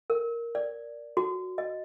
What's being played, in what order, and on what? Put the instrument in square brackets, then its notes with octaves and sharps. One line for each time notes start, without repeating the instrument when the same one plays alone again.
[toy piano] A#4
D5
F#4
D#5